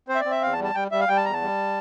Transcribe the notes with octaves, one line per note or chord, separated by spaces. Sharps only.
C4 C5
E5
D5
C4
E5
E2 F5
A5
G3
A5
G3 G5
G3 E5
F5
G3 G5
A5
E2 A#5
A5
G3